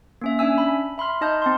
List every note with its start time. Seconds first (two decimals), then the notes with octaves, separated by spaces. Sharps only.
0.22 A#3 C#4 E5
0.39 C#4 D4 E5 G#5 E6
0.58 B5
0.98 E5 B5 C6 F6
1.21 D#4 D#5 A5 F6 G6
1.42 C4 A5 C6